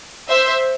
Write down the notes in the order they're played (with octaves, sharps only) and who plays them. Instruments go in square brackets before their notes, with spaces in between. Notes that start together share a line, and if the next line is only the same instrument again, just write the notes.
[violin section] C5 E5